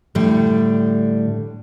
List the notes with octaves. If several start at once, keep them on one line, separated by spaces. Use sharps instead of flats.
A2 D3 G3 D4